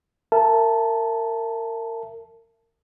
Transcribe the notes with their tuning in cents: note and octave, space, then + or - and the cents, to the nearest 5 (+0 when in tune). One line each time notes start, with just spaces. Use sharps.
A#4 -30 E5 +25 A5 -10